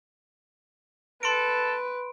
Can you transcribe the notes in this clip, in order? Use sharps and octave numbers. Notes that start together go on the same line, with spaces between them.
A4 B4 C6 D7